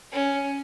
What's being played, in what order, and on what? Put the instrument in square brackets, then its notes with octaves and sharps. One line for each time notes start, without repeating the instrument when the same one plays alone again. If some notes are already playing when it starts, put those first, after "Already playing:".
[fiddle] C#4